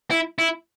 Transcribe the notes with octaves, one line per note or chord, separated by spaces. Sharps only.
E4
E4